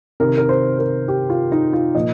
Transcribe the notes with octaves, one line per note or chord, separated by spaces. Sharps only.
C3 D#3 A#4
A#4
C5
A#4
G4
F4
D#4
F4
A#2 F3 D#5